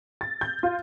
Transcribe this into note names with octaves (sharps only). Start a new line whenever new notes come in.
A6
G6
F4